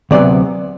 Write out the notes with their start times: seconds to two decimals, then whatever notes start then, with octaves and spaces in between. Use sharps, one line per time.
0.11 D2 C3 F#3 B3 D5